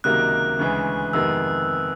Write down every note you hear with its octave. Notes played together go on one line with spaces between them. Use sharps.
C#2 C3 D#3 F#3 A#3 F#6
D2 C#3 E3 G#3
F2 C3 D#3 G#3 B3 E6